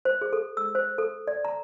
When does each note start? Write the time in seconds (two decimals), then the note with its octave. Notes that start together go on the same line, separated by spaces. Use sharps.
0.05 C5
0.22 G#4
0.33 A4
0.57 E6
0.75 C5
0.98 A4
1.27 D5
1.45 A#5